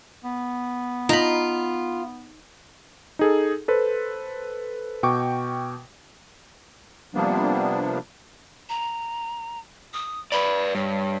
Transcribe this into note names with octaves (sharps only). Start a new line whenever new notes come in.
B3
D#4 F4 B5
D#4 G#4 A4
A4 B4 C5
B2 G5 C#6 D6
C3 F3 G3 A#3 B3 D4
A#5
D#6
B4 D5 B5
G2 C#5